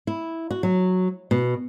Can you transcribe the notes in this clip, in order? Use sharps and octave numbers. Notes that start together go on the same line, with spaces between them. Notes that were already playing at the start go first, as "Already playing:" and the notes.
E4
F#4
F#3
B2